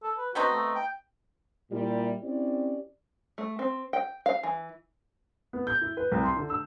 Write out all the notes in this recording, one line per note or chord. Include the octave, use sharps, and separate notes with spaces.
A4
B4
B3 C4 D#4 F#4
A3
G5
A#2 G3 E4
C4 C#4 E4 G4 D5
A3
C4
G5
F5
E3
B3
G6
E4
B4
C2
C6
D3
E6